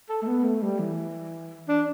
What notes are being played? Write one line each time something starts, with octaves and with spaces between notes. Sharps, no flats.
A4
A3
B3
A3
G3
E3
D4